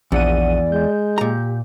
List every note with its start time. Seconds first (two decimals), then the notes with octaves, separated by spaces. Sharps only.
0.12 A#1 E2 D5 F#5 D#7
0.72 G#3 G6
1.18 A#2 G4 A#5